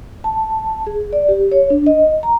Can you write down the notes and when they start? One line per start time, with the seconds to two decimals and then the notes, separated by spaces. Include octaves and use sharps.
0.24 A5
0.87 G#4
1.13 D5
1.29 G4
1.52 C#5
1.70 D4
1.87 D#5
2.23 A#5